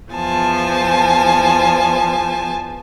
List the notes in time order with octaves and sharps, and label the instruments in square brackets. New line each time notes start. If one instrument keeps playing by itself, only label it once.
[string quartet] E2 F3 G#5 A5